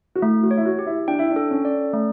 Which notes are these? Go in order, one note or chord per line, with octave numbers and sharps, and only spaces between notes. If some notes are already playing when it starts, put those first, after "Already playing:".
F#4
A3 E4
F#4
C#5
E4
F#4
G4
E4
D4 G5
E4
D4
A4
C#4
D5
A3